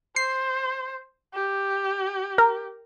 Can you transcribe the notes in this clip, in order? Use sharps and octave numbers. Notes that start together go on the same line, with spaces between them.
C5 C7
G4
A#4